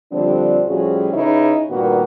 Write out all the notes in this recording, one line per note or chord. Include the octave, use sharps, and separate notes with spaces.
D3 F3 G3 C4 D4
A2 F3 G3 C#4 F#4 G#4
C#3 D#4 E4 B4 C#5
G2 A#2 D#3 A#3 B3 F#4